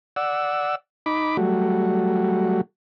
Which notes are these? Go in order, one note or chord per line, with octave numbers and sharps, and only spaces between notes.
D5 F#5 E6
D#4 B5 D6
F#3 G3 A3 F#4